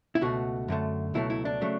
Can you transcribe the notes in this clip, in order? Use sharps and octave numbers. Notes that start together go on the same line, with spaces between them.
E4
C#2 B2 A3 F#4
F#2 D3 A3
C#2 B2 F#3 A3 E4
E4
D4
C#3 F#3 A3